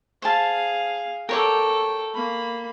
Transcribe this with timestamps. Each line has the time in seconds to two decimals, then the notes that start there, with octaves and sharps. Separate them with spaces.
0.22 G#4 C5 F5 A5
1.29 A4 A#4 C#5 G5 D6
2.14 A#3 B5